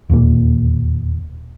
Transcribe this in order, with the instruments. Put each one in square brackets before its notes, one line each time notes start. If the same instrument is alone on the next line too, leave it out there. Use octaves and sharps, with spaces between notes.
[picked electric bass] E1 D#2 A#2 A#3